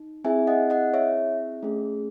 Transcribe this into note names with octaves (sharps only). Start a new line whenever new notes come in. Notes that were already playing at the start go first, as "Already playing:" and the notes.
Already playing: D#4
C4 E4 G#4 E5 G#5
D#5 F#5
D#5 F#5
C#5 E5
A3 C#4 G#4